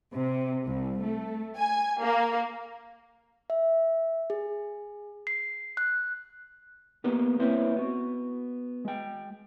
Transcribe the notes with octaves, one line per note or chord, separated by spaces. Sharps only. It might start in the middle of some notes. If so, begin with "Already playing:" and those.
C3
C2
A3
G#5
A#3
E5
G#4
C7
F#6
A#3 B3 G4 A#4 B4
A#3 C4 C#4 E4 B4 C5
B3 F#4
G#3 G5